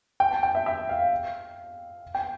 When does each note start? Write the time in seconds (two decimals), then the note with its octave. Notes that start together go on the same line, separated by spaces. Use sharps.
0.20 G5
0.31 A5
0.43 G5
0.55 E5
0.66 E5
0.89 F5
2.15 G5